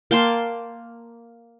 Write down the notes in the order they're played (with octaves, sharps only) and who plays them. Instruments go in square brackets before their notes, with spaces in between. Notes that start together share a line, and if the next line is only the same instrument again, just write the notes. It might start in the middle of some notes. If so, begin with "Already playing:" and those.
[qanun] A#3 G5 A5 C6